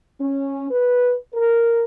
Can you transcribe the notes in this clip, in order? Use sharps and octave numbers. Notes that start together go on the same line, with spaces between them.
C#4
B4
A#4